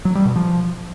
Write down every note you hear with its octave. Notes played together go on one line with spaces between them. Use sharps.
F#3
G3
B2
F3